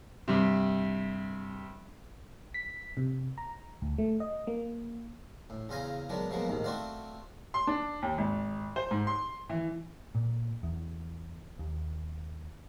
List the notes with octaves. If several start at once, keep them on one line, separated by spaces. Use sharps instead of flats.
G2 C3
B6
C3
A#5
D2
A3
D#5
A#3
A2
E2 C#3 F4 F5 G#5 A#5
D#3 F#3 G#3 B3 D4
B2 F3 F#3 G#3 A#3 B3
A1 D#2 G#2 D#3
A3 C4 F#4 C5 D5 F5
C6
D4
D#2
G#1
C5
G#2
C6
E3
A#2
E2
D#2